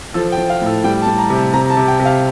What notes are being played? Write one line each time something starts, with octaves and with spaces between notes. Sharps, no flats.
F3 A4
G5
F3
F5
A2 A4
G3 G5
A5
G3
A#5
C3
A5
C3 A#5
A#5
A5
C3
G5
C3
F5